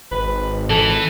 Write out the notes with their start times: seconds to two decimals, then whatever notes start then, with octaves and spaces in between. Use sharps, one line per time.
0.11 G#1 B4
0.70 E3 A4